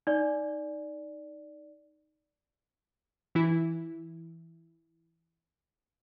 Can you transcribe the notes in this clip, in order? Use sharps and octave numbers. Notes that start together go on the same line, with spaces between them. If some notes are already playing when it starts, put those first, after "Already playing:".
D#4 D5
E3 E4